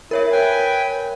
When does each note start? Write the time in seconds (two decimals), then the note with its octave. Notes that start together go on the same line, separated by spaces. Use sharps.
0.11 E4 A#4 C#5 E5
0.32 B4 G5 G#5